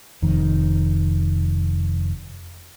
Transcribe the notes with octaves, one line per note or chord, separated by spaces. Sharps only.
F1 F2 D#3